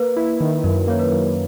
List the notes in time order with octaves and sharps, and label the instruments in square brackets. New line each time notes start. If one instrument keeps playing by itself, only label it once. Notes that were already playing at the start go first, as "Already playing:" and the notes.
Already playing: [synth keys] A#3 [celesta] B4
[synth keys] E4
D#3
[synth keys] F#2 [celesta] A#4
[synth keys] A#3 [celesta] C#5
[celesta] B4
[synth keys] F#2